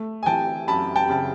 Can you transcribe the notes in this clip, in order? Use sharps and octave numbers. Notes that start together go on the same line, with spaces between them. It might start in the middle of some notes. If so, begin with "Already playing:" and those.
Already playing: A3
G#5
E3 G5 A5
F#2 A5 B5
G5 A5
C#3 A5